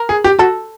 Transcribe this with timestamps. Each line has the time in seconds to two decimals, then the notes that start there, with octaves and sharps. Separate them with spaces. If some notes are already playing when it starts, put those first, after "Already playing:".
Already playing: A#4
0.09 G#4
0.24 G4
0.39 F#4 A4